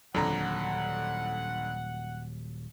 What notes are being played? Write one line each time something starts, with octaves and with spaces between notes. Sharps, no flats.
D#1 F2 D3 F#3 F#5 A#5